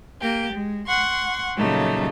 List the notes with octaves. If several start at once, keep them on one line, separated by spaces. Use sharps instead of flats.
A#3 G4
G#3
F#5 C6 C#6
A#2 C#3 F#3 G3 A3 D#4